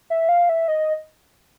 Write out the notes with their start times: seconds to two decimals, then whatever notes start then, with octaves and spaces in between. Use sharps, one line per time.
0.10 E5
0.29 F5
0.49 E5
0.68 D#5